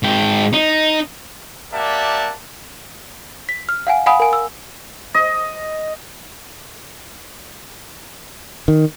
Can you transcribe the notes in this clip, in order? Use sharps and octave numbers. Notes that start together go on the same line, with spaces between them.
G#2 G5
D#4
A#3 G4 D5 E5 F#5 A5
B6
F6
F5 F#5 G#5
F5 F#5 G#5 B5 D#6
A#4 G#5
E6
D#5
D#3